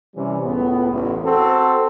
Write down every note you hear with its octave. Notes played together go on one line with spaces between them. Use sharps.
C3 E3 G3 C#4
C#2 A2 B3
A1 E2 E3
C4 F#4 A4